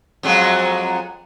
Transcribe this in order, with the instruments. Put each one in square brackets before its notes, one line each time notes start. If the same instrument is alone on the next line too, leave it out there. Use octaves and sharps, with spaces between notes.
[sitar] F2 F#3 G#3